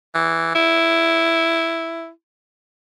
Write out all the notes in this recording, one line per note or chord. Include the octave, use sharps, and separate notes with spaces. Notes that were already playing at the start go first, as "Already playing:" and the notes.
E3
E4